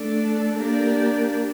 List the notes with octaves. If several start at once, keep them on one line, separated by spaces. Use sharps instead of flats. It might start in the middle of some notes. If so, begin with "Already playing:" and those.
Already playing: A3 D4 A4 D5
A#3 D4 G4 A#4 D5